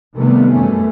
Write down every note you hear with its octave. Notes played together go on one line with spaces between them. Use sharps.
C3 D#3 G3 A3 B3
F#2 B2 A3 C#4